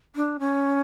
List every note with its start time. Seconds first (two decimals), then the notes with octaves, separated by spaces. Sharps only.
0.16 D4
0.39 C#4